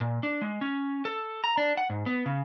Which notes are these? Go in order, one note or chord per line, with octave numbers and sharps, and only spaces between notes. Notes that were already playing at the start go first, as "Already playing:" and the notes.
A#2
D4
G#3
C#4
A4
A#5
D4
F#5
G#2
B3
C#3